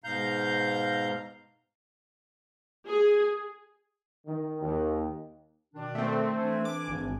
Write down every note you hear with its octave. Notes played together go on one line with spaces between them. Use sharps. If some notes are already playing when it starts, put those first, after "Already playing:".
G#2 B2 F5 A#5 G6
G#4
D#3
D#2
B2 D#3 D4
A3 C4
E3 D4 G#5
D6
G#1